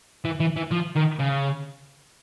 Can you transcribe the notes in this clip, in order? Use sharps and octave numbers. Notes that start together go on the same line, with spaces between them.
E3
E3
E3
F3
D#3
C#3